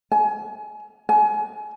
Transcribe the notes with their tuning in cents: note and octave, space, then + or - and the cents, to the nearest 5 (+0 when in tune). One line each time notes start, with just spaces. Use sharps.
G#5 +25
G#5 +30